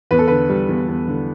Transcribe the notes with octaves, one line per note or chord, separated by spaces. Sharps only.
E2 B4
A4
D3 B4
G3
E2
E2
D3